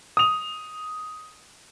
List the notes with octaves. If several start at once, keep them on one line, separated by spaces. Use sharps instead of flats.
D#6 F7